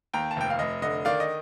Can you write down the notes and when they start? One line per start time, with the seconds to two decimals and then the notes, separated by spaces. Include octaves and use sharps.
0.13 D#2 G5 A#5
0.31 A5
0.36 F1 G5
0.50 F5
0.59 F1 D#5
0.82 D3 D#5
1.05 D#3 D5 F5
1.20 D#5